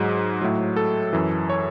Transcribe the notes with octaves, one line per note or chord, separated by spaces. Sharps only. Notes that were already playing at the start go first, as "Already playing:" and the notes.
Already playing: G#2 F#3 G#4
A2 F#3
A4
F#2 E3
C#5